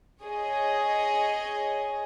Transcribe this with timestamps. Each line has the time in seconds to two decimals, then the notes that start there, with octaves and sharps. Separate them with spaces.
0.22 G#4 C#5 D#5